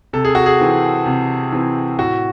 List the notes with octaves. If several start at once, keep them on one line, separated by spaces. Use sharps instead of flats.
C3 A4
G#4
F#4
G#4
E3 C4
C3
E3 C4
A2 F#4